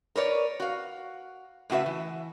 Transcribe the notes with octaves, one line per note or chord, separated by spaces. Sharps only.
A#4 B4 C#5 D5
F#4 F5
A2 C#3 F#4 B4 E5
E3